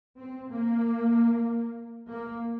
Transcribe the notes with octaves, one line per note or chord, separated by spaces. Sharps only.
C4
A#3
A#3